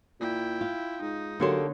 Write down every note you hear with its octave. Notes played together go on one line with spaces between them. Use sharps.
A#2 E4 G5
F4
G#2 D#4
D3 F#3 A#3 G4 A4 C#5 C6